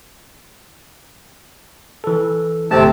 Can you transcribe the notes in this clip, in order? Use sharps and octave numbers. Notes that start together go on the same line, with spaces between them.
E3 A4
G1 C3 A3 C4 A5